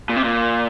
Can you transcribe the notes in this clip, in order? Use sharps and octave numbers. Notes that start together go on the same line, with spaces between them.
A#2
C3
A#2